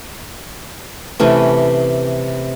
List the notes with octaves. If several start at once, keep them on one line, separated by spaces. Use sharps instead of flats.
C3 E3 A3 C#4